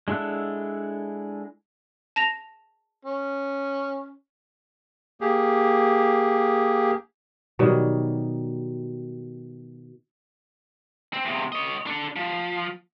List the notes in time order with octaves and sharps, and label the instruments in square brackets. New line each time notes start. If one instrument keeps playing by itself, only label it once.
[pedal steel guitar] G#3 D4 E4 A4 F#5
[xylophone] A5 A#6 F7
[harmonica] C#4
[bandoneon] A#3 G4 G#4
[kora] B2 D#3 F#3 G3
[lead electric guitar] C4
E2 C3
C#5 D#5
D4 A4
F3